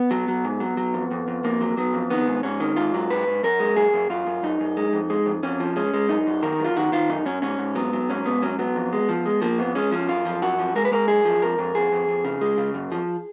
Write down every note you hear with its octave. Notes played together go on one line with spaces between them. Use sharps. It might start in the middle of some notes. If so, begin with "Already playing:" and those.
Already playing: B3
F#3
F#3
G#2
F#3
F#3
F2
F2
F2
F2 A#3
F#3
F#3 B3
F2
D#3 B3
G#2
G#2 C#4
D#3
G#2 F4
F#3
G#2 B4
G#2
F#2 A#4
G#3
F#2 G#4
F#2
F#2 F4
F#2
F#2 D#4
F#2
G#3
F2
G#3
F2
F2 C#4
F3
G#3 C#4
G#3
F#2 D#4
F#2
D#3 A#4
F#2 F4
D#3 F#4
D#3 F4
F#2 D#4
F#2 C#4
G#2 C#4
G#2
F#3 B3
F#3
G#2 C#4
G#2 B3
F#3 C#4
F#3 B3
F2
G#3
F3
G#3
F3 A#3
F2 B3
G#3 C#4
F3 C#4
F#2 F4
F3
F#2 F#4
F3
G#3 A#4
B4
G#3 A#4
F#2 G#4
F3
F2 A#4
F2
F2 G#4
F2
F2
C#3
G#3
C#3
F#2
F3